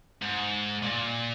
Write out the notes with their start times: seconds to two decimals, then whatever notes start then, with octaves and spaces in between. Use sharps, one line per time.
0.22 G#2
0.83 A#2